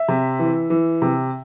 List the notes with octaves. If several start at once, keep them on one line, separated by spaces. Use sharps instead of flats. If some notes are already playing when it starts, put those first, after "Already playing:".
Already playing: E5
C3
E3
E3
C3